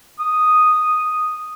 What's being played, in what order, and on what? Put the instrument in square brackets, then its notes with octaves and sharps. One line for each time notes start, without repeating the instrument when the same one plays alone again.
[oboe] D#6